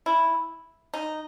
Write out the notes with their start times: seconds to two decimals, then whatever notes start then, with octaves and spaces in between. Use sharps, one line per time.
0.06 E4
0.94 D#4